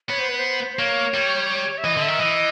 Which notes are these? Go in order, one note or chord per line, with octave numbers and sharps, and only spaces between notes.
B3 C#5
C5
B4
C5
C5
A#3 C#5
G3
E5
E3 D#5
D3
E5
D#3
E3 D#5